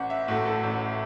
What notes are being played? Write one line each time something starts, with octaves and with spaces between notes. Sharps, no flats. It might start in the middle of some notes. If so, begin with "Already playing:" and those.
Already playing: A1 F#5
E5
A2 A3 F#4
A4
A1